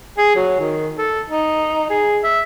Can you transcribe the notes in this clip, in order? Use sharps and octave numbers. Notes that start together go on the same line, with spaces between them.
G#4
F#3
D#3
A4
D#4
G#4
E5